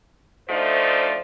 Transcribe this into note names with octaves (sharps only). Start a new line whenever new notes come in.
D2 F3 A3 D#4 C5 D5